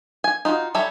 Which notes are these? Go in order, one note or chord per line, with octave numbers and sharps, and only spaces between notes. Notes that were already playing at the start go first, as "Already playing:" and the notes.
G#5
D#4 F4 F#4
G3 A4 C#5 E5 A#5